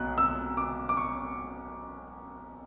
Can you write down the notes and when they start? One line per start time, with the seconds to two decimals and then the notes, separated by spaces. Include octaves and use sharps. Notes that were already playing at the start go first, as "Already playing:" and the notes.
Already playing: B1 B2 F#6
0.18 E6
0.57 D6
0.89 D6
0.97 C#6